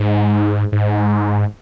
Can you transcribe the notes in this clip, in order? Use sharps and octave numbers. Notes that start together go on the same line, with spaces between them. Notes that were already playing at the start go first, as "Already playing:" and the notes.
Already playing: G#2
G#2